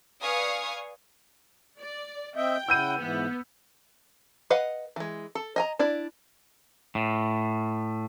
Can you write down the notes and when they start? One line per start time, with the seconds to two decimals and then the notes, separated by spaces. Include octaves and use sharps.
0.23 B4 D5 F5 G#5 C#6 D#6
1.79 D5
2.36 C4 D#5 E5 G5
2.69 C#3 E4 F#5 E6 G6 D#7
2.99 G#2 E3 B3
4.50 B4 D#5 F5 F#5
4.96 E3 G#3
5.35 A4
5.56 D#5 G#5 A#5
5.79 D4 E4 D5
6.95 A2